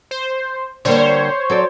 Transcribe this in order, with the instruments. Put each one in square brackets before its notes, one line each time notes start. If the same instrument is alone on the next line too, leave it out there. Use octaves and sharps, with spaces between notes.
[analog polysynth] C5
[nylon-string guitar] D3 G3 A#3 [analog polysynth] C5 C#5
[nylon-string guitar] F#3 A4 D5